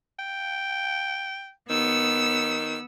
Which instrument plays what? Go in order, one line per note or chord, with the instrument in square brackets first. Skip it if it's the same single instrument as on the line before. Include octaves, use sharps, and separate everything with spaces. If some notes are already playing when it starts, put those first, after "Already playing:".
[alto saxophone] G5
[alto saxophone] D#3 [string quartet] B3 E6